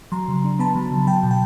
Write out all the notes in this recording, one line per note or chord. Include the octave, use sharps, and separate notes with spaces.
F#3 A#5 C6
C#3
D4
B3 A5 B5
F#3
C#3
F#3 G5 A5
B2
G5